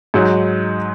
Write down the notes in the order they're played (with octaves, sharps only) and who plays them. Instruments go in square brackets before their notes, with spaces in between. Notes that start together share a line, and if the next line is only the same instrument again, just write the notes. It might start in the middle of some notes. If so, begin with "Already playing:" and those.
[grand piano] G#2 F#3 D#4